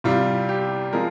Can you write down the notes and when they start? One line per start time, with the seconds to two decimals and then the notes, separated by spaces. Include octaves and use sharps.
0.04 C2 C3 G3 F4
0.49 G4
0.93 F3 G#3 A#4